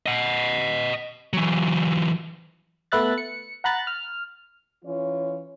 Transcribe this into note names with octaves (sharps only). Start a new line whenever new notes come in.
D#5 F#5
E3 F#3
A3 B3 B4 E5 F#6 A6
C#7
F#5 A#5 B5 F#6 A6
F6
E3 C#4 F4 C#5